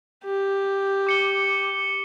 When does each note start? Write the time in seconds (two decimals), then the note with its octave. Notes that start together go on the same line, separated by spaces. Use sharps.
0.25 G4
1.07 D6 C#7 G7